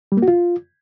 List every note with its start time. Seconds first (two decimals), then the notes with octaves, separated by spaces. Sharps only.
0.12 G3
0.17 A#3
0.22 F#4
0.28 F4